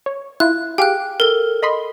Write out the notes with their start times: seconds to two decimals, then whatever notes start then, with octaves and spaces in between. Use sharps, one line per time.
0.06 C#5
0.40 E4 F4 F#6
0.78 G4 G#4 F5 G5 F#6
1.20 A4 A#4
1.63 D#5 B5 C6